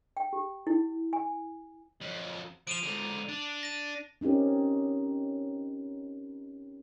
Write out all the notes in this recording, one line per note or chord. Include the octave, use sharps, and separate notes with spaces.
G5
G4
E4
G#5
F2 F#3
F3 D7 D#7 F7
G#2 D3
D4
A#6 D#7
C4 C#4 D#4 G4 A#4